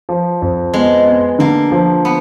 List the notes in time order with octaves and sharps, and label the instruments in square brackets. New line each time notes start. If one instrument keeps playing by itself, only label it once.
[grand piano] F3
F2
[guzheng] G#3 [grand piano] B3
[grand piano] B3
[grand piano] D3 [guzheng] A#3
[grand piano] F3
[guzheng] B3